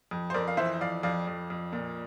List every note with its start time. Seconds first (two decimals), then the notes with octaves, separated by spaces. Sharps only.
0.11 F2
0.30 C5
0.34 F2 A#4 D5
0.48 F5
0.57 E3 C5 E5
0.81 F2 D5 F5
1.03 F2 D5 F5
1.27 F2
1.50 F2
1.73 A#2